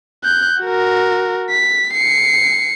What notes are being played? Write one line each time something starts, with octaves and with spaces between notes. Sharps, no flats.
F#6 G6
F#4 A#4
B6
C7 C#7